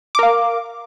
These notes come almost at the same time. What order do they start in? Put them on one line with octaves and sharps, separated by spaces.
D6 A#4 F5